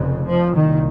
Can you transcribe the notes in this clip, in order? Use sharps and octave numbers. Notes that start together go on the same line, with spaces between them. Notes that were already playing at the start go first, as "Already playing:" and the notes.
Already playing: F1 F2 C#3
F3
C2 A#2 D#3